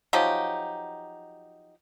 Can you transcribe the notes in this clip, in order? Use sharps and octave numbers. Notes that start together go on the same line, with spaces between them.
F3 F#3 D#4 G4